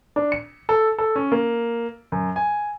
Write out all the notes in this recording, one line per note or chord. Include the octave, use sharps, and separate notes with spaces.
D4
C#7
A4
A4
C#4
A#3
F#2
G#5